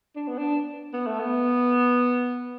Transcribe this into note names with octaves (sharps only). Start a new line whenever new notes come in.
D4
B3
D4
B3
A3
B3